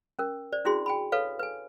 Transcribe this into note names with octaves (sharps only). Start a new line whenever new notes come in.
C#4 A#4
C5 D5
C#4 D4 E4 F#4 G#4 C6
G5 G#5 B5
A4 B4 C#5 F5
B4 G#5